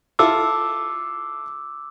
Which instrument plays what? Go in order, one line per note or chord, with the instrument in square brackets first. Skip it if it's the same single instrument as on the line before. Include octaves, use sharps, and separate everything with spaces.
[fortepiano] E4 F4 A4 [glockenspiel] D6 E6